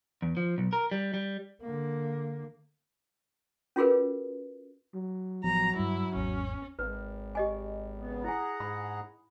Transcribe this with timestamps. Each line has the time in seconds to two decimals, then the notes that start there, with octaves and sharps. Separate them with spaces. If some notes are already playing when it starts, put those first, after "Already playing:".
0.22 E2
0.37 F3
0.58 B1
0.73 A#4
0.91 G3
1.14 G3
1.62 D3 A#3
3.76 C#4 F4 F#4 G#4 A#4 B4
4.94 F#3
5.44 A1 F3 F#3 B3 A#5
5.76 G2 G3 E4
6.15 G#1 E2 C#4
6.79 G#1 B4
7.35 G4 D#5 G#5
7.98 C#3 B3
8.24 E4 G#4 F#5 G#5 A#5
8.60 G#2 B5